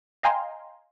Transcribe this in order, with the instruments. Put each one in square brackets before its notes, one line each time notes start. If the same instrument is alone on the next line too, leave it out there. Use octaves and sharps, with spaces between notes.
[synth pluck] D#5 F5 G5 G#5 A#5 C6